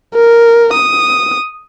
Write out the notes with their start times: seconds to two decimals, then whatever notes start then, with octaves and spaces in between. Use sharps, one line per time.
0.15 A#4
0.73 D#6